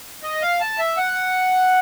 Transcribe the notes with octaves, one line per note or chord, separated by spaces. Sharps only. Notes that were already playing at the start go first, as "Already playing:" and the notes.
D#5
F5
A5
E5
F#5